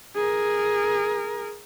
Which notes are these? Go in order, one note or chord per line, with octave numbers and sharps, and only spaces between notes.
G#4 A#4